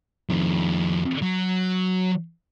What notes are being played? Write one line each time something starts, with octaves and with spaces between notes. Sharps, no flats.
F2 D#3
F#3